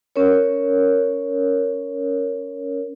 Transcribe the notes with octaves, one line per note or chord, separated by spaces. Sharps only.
C#4 A#4 C#5